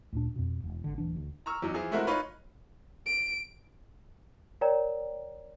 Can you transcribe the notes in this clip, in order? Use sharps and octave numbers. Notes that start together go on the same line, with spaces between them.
D2 A#2 D4
F2 B2
E1
G#1 D3
D1 E3 D4
D2
A#5 C#6 E6 F6
E2 F#3 D#4
E3 F3 G#4
G#3 A3 C4 E4 F#4 A#4
D#4 F4 B4 C#5 B5
D7
A#4 C#5 D5 G5 A#5